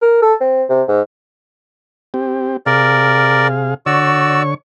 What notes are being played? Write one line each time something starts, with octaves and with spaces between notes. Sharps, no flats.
A#4
A4
C4
C3
G#2
C4 G4
C3 G#4 A#4 D5 F5
D3 F#4 C#5 D5 C#6 E6